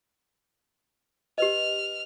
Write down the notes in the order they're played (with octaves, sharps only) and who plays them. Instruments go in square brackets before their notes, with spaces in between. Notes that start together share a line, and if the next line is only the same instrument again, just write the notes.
[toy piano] G4 B4 D#5 [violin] F6